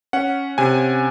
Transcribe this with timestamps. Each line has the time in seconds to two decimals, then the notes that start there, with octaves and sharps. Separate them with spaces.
0.13 C#4 F#5
0.58 C3 G#5